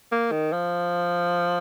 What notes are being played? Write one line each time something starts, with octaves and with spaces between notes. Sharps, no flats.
A#3
D#3
F3